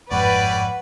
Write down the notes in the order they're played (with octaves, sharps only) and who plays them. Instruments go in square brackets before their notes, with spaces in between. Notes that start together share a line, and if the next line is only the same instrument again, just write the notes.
[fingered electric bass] G1 F2 G#2 [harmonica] G3 C#5 D5 [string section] B4 [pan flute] F#5